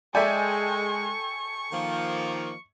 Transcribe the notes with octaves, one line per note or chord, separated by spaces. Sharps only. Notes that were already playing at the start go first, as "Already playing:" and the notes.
G#3 A4 D5 E5 G5 G#5 C#6
D#3 F3 A#3